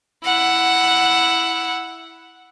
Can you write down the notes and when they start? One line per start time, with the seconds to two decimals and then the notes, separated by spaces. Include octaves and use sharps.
0.25 E4 F#5